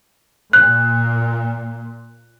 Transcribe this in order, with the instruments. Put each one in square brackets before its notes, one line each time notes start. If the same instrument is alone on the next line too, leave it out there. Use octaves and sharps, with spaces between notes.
[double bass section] A#2 [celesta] F#6